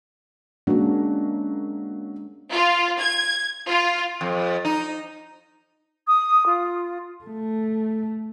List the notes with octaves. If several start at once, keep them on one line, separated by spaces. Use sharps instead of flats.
F#3 G#3 A#3 C#4 D4
F4
G#6
F4
F2
D#4
D#6
F4
A3